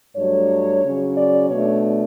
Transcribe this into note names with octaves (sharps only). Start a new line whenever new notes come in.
G2 F#3 A3 D4 C#5
C#3 F#3 C#4
D5
B2 A3 D4 C#5